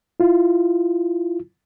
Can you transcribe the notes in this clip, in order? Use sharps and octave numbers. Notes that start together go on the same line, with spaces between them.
E4 F4